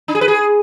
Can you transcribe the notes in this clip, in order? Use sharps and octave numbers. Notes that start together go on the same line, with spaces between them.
D4
G#4
B4
G#4